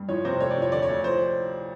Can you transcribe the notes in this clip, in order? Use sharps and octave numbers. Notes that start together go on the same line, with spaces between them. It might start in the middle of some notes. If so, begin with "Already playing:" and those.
Already playing: G2
F3 C#5
C3 C5
A3 C#5
D5
F3 C#5
D3 D5
C#5
D2
F3 C5